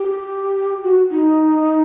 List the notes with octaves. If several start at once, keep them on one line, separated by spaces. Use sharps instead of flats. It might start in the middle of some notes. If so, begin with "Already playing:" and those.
Already playing: G4
F#4
D#4